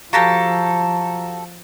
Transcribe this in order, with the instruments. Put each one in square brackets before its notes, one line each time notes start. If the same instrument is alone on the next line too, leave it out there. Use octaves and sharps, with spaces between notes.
[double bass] F3 [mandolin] F#4 G4 A4 [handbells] F5 A6 A#6 [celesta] A#5